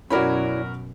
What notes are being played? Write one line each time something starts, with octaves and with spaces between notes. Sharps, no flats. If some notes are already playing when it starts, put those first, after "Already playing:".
F#2 B2 C#4 E4 F#4 A#4 D5 B5